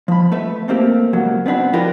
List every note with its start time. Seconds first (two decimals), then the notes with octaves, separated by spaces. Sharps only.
0.08 F3 B5
0.32 A3 B4 E5
0.68 A3 A#3 C4 G4
1.13 C#2 F#3 A#3
1.46 B3 C4 D4 B4
1.73 F3 D4 F4 G4 A#4 B4